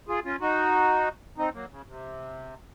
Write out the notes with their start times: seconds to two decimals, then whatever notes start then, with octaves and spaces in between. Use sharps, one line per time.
0.08 F4 G#4
0.25 C#4 F4
0.41 D#4 F#4
1.38 C4 D#4
1.54 F#3 A#3
1.71 C#3
1.87 C3